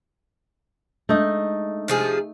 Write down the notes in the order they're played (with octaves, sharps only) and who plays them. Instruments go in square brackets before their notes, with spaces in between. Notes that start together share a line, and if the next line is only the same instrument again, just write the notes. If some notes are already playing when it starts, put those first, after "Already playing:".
[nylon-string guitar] G#3 D4 [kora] A3 D#4
[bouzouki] C3 F3 G#4